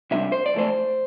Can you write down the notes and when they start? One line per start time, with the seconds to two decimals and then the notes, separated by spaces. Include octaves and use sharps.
0.11 C3 G3 D4 E5
0.32 C5
0.46 D5
0.54 F2 E3 A3 C5